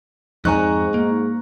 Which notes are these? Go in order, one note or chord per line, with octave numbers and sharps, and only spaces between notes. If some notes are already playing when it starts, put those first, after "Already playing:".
F2 G#2 C4 D#4 G#5 A#5 C#6 F#6
A#3